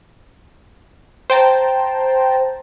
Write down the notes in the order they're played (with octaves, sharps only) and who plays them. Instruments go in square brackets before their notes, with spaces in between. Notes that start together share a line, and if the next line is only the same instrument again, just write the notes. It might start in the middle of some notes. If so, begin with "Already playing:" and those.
[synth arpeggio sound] C5 G5 A5 A#5